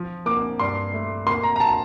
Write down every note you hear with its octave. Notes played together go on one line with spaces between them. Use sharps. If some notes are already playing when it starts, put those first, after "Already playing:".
Already playing: F3
A#3 D6
G2 C6
A3
A#3 C6
A#5
A#5
A5